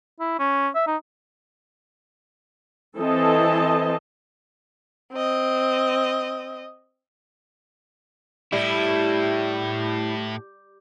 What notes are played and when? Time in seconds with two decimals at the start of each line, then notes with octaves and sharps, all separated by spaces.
0.20 E4
0.39 C#4
0.75 E5
0.87 D#4
2.97 E3 C4 A4 D#5 A5
5.13 C4 D#5
8.52 A2 G3 E4